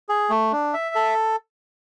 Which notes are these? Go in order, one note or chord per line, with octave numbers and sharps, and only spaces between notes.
G#4
A3
D4
E5
A4